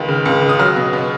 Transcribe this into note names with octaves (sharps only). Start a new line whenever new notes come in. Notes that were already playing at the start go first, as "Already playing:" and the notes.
Already playing: C#2 D#3
C#3
C#2
C#3
D#6
F#3 F6
B2
B2